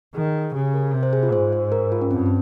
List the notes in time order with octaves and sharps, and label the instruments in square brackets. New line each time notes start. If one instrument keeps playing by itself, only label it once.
[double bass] D#3 [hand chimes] G#4
[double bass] C#3 [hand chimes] G4
[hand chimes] A#4
[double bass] C3
[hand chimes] C5
G#4
F4
[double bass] G#2 [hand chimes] C5
[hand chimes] C5
A#4
F4
C#4
[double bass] G2 [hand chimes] C4
[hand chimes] C4